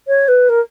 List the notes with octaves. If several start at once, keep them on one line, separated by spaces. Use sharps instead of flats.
C#5
B4
A#4